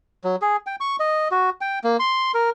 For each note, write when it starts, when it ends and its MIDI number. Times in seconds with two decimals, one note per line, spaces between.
0.24 0.36 54
0.42 0.57 68
0.66 0.76 79
0.80 0.96 85
1.00 1.28 75
1.31 1.50 66
1.61 1.79 79
1.84 1.97 58
1.99 2.32 84
2.34 2.50 70